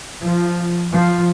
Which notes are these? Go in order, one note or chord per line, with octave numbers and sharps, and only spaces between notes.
F3
F3